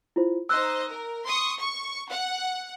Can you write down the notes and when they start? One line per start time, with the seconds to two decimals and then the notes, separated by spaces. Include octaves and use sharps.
0.16 E4 F4 C5
0.49 D#4 C5 D#5 E6 F#6
0.90 A#4
1.26 C6 C#6 D#6
1.60 C#6
2.08 F#5